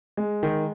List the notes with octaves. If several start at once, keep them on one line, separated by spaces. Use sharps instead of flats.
G#3
D#3